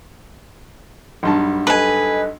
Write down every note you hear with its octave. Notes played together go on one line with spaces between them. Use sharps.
B1 G2 A5
A4 B4 D#5 G#5